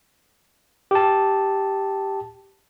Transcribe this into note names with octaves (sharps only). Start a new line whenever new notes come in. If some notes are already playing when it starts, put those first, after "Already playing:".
G4 A5